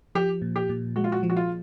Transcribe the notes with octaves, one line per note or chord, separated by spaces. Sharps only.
F3 G4
A#2
G4
A#2
G#3 F#4
F4
F#4
F3
F#4
F4